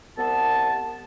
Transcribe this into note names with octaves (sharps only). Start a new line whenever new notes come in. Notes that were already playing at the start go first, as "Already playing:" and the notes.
C2 B3 A5